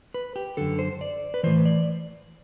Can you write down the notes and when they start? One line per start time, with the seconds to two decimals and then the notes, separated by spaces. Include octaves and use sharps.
0.14 B4
0.36 G4
0.57 F#2 D3 A4
0.79 C5
1.01 D5
1.34 B4
1.43 A2 E3 C5
1.65 D5